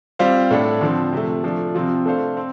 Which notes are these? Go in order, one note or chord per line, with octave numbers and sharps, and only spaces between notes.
G3 C4 F4 C5 F5
A2 A3 D4 A4
D3 F3 C4
C3 F3 A3
F3 A3 D4
C3 F3 C4 F4
A3 D4 A4 C5 F5
C4